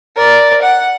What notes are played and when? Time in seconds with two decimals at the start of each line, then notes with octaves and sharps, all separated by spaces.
0.16 A#4 D5
0.62 F#5